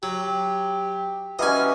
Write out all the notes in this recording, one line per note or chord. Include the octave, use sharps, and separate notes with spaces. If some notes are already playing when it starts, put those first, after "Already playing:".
F#3 G4
E3 F#3 G3 C#4 D#5 G#5